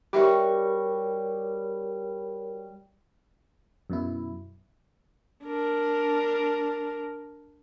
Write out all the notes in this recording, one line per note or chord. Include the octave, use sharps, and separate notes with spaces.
G3 F#4 G4 A#4 C#5 E5 C#6
F#2 B2 E4
D4 A#4